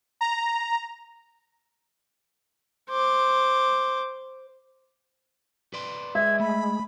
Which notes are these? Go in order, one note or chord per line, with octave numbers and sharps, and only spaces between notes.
A#5
C5 D6
B4 D5 C6
G#3 E5 G#6
A3 B5